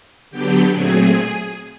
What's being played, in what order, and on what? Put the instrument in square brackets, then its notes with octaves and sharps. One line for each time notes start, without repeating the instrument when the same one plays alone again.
[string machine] D3 F#3 B3 D4 G4 G5
A#2 F#3 A3 C4 G#4 G#5